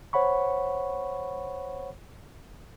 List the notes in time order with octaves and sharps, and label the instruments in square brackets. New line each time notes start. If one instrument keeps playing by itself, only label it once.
[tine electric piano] C5 C#5 F#5 B5 C#6